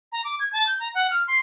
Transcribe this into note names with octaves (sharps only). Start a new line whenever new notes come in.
A#5
D6
G#6
A5
G6
A#5
F#5
F6
C6